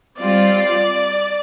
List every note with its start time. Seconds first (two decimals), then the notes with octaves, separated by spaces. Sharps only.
0.19 G3 C4 F4 D5